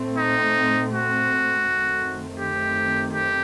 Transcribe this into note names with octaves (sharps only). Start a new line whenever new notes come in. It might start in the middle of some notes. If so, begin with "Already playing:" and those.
Already playing: A#2 A3 C4
D#4
F#4
F#2 D#3 A3 C4
G4
G4